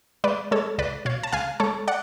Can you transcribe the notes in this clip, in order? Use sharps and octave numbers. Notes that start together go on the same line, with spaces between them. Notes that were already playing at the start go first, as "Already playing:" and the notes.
G#3 B4 D5
G#3 A4 C#5
C#2 B4 D5
B2 C#5 F5
A5
C#2 F5 G#5
G#3 A4 C#5
D5 F#5